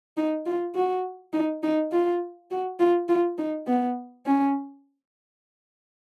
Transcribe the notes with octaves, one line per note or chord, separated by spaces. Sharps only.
D#4
F4
F#4
D#4
D#4
F4
F#4
F4
F4
D#4
B3
C#4